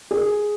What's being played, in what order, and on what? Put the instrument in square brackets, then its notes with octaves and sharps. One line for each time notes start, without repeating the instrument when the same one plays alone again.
[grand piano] G#4